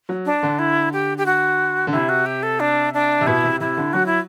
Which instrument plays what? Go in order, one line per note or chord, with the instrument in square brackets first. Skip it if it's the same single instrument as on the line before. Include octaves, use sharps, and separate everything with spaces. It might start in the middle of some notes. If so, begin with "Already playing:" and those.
[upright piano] F#3
[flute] D4
[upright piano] D3
[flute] E4
G4
G4
F#4
[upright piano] D3
[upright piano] C3 [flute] E4
[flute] F#4
G4
A4
D4
D4
[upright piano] C3
[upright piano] B2 [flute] E4
[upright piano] C3
[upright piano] C3 [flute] E4
[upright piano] D3
[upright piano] F#3 [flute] F#4
[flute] E4